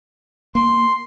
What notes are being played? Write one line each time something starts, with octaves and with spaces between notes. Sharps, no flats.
A#3 C6